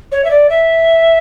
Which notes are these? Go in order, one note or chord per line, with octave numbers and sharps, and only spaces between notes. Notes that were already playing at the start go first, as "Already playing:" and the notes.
C#5
E5
D5
E5